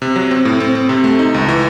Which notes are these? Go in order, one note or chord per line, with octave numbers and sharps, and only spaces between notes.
C3
F#3
C4
A2
C4
C4
C3
A3
D#4
C#2
E3